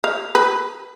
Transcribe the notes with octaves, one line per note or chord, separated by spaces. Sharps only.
F5
B4